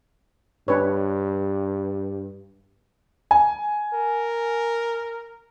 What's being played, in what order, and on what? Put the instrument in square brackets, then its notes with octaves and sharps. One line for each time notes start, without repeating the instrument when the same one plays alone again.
[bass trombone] G2 [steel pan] D4 B4 C#5
[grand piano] G#5
[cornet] A#4